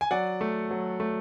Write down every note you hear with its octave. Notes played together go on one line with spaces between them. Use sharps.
G#5
F#3 D5 F#5
A3
F#3
A3